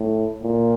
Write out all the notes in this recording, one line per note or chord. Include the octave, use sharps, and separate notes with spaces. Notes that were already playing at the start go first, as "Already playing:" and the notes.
Already playing: A2
A#2